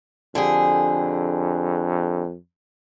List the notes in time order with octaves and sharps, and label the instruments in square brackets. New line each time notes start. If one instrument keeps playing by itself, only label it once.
[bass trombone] F2 [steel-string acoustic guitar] D3 G4 G#4